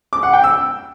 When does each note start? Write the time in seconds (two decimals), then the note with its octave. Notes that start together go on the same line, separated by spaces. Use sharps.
0.13 D6
0.23 F#5
0.33 G5
0.44 E6